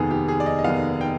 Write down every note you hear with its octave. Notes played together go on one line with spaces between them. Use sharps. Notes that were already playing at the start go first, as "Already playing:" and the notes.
Already playing: F1 D#2 D#3 B3 G#4
G4
G#4
D5
D#5
D#5
F1 D#2 D#3 B3 F5
G5